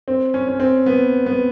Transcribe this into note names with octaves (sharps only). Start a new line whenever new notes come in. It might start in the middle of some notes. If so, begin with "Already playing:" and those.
C4
C#4
C#4
C4
B3
B3